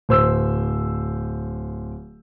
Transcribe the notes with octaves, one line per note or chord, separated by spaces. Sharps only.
D1 C5 E6